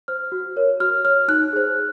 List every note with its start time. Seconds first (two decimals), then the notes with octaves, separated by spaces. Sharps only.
0.08 C5 F6
0.32 F#4
0.56 A#4 C#5
0.80 F#4 F6
1.04 C#5 F6
1.28 D#4 F#6
1.53 G#4 C5